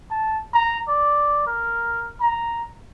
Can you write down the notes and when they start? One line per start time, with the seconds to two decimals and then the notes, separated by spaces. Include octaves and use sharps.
0.11 A5
0.54 A#5
0.88 D5
1.47 A#4
2.21 A#5